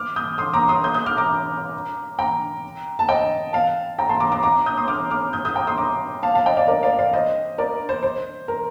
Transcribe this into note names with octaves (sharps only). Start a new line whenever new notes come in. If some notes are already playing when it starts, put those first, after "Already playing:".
Already playing: D6 F6
D#6 G6
C6 D#6
A#5 D6
C6 D#6
D#6 G6
D#6 G6
D6 F6
A#5 D6
G5 A#5
A5
D#5 G5
F5 A5
G5 A#5
A5 C6
A#5 D6
A#5 D6
A#5 D6
D#6 G6
C6 D#6
D6 F6
D6 F6
D#6 G6
D#6 G6
G5 A#5
C6 D#6
A#5 D6
F5 A5
F5 A5
D#5 G5
D5 F5
A#4 D5
D5 F5
D5 F5
C5 D#5
A#4 D5
C5
C5
A#4